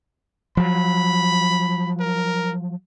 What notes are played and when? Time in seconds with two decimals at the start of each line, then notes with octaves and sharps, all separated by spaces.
0.57 F3 F#3 B5
2.00 A#4